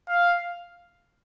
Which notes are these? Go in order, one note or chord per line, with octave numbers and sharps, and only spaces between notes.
F5